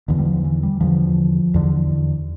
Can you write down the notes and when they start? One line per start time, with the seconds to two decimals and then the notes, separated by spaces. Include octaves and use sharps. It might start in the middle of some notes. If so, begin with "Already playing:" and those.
0.08 E2 D3 E3
0.19 G3
0.25 F3
0.44 E3
0.63 G3
0.80 E2 D3 F3
1.54 E2 D3